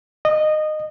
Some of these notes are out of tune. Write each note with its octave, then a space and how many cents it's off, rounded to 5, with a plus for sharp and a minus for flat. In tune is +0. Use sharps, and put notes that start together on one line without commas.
D#5 -20